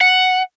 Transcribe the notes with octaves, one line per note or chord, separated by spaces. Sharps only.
F#5